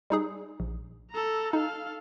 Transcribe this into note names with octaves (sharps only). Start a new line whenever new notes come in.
G3 D#4 G#4
A#1
A4 A#5
D#4 A4 F5